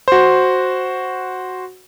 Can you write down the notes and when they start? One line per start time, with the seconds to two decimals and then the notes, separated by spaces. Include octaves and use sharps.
0.08 F#4 C5